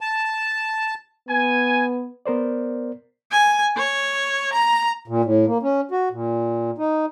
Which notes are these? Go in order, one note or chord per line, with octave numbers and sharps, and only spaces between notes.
A5
B3 G#5
B3 A#4 C5 D5
G#5
C#5
A#5
A#2
A2
A#3
C#4
F#4
A#2
D#4